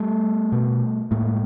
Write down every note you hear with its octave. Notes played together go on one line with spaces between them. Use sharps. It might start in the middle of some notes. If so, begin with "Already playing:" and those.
Already playing: G3 A3
B2
A2 G#3 A#3